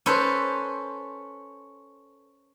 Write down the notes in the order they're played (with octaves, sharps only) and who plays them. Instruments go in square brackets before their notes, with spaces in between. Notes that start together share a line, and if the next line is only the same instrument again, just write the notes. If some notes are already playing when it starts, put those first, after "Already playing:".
[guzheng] C#4 A4 B4 C5